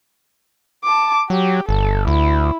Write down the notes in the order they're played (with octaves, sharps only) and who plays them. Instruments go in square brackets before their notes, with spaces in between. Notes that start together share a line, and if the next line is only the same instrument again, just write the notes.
[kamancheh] A5 D6
[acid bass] F#3 [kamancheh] G4
[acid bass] G1 [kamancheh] A4
[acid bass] D2 [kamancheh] E4